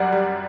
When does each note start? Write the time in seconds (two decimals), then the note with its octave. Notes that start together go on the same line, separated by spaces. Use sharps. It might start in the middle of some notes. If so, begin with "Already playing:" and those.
Already playing: F#2 G3 D5 F#5
0.12 G3